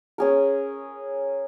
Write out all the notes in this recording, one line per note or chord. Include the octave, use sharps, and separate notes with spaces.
C#4 G#4 A#4